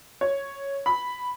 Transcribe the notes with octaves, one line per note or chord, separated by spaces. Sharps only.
C#5
B5